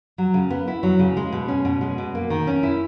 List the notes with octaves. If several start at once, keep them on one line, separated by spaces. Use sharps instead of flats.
F#3
C#3
B3
E4
F#3
C#3
G#3
B2
C#4
B2
G#3
B2
A#3
D#3
C#4
E4